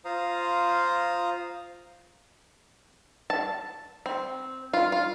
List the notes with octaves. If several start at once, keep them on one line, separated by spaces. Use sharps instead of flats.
F4 C5 F5 A#5 D#6
A5
C4
F4
F4